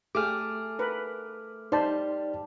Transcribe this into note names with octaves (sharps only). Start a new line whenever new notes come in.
A3 G4 G#4 D6 F6
A#4 B4
G3 D#4 C5 D5 A5